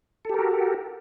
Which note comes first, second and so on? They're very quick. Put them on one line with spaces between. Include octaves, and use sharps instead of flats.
A4 G4 A#4 F#4